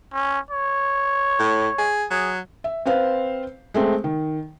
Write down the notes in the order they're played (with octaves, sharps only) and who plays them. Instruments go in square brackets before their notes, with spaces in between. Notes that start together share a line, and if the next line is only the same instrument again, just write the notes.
[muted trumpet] C#4
C#5
[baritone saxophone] A2
G#4
[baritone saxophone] F#3 [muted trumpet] G#4
[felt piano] E5
C4 B4 C5 F5
G#3 A3 C4
D#3